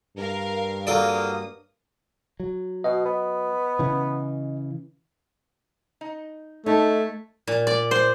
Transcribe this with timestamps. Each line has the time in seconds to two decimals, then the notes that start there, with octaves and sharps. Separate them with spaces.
0.17 G2 A#4 F5
0.87 F#3 A#3 F4 A4 D5 D#6
2.40 F#3
2.84 B2 D#5
3.05 B3
3.79 C#3 E3
6.01 D#4 D#5
6.66 A3 D#4 C#5 A5
7.47 A#2
7.67 D5
7.91 C5